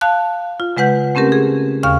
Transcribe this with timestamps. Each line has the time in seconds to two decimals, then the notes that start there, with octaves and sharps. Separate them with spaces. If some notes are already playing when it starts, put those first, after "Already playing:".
0.01 F5 A5 F#6
0.60 F4
0.77 C#3 G#3 B4 F#5 G6
1.15 A3 C4 C#4 G4 A#4
1.32 G#4
1.83 D#2 C#3 F5 C#6 F6